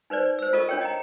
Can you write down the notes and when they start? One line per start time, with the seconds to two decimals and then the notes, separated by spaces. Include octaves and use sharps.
0.10 D#4 B4 C5 D5
0.39 C5 E6
0.53 F4 A4 A#4 D#5 C#6
0.69 D4 C#5 G5
0.81 D#5 G5 A#5